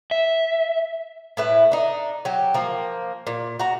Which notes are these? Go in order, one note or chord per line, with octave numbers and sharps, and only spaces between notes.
E5
A2 E4 B4
D4 D#4
F#3 G4
F3 A#3
A#2
F#4 A#5